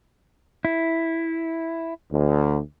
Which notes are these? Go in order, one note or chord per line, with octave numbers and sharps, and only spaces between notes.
E4
D2